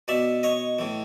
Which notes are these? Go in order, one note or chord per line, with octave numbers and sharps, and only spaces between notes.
B2 D5 E5
C#5 D#5
A2 E3